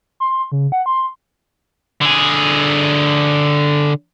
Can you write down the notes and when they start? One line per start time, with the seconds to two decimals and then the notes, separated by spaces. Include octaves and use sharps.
0.20 C6
0.52 C#3
0.72 F#5
0.86 C6
2.01 D3 G#4